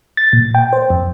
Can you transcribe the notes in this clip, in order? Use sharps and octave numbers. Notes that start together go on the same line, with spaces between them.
A6
A#2
G5
C5
F2